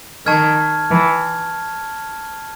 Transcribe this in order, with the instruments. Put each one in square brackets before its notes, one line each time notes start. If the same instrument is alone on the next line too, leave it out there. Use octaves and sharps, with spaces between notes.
[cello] D#3 [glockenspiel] A5 C#6 F6 G#6
[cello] E3